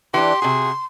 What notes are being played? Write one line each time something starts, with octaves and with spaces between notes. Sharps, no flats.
E3 D4 G4 C6
C3 F#4 G#4